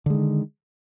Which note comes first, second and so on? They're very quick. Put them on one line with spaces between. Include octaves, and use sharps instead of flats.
D3 G#3 D#3